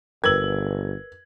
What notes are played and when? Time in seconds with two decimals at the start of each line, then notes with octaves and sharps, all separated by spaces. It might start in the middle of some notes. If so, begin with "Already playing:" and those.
0.24 G1 A#4 B4 E6 G#6 F#7